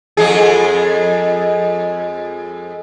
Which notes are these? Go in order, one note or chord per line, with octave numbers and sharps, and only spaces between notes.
F2 G#3 G#4